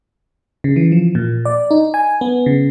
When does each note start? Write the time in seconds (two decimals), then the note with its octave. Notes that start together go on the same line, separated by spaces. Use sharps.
0.64 C#3
0.76 E3
0.92 F3
1.15 A#2
1.45 D5
1.71 D#4
1.94 G#5
2.21 B3
2.46 C#3